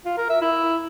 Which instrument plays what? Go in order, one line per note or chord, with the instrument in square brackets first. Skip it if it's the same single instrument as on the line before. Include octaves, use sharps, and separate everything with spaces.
[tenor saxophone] F4
A#4
E5
E4